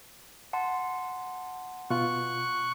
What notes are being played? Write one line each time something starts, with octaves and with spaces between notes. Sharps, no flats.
F#5 A5 C6
B2 F4 C#6 F#6